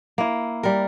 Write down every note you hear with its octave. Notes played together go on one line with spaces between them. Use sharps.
A#3 E4
G3 A#4